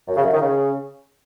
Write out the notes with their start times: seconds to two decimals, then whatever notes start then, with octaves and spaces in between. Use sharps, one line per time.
0.08 F#2
0.16 C#3
0.24 F#2
0.33 D#3
0.41 C#3